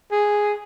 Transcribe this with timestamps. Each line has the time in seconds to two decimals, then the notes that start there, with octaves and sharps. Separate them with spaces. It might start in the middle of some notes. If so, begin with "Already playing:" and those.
0.12 G#4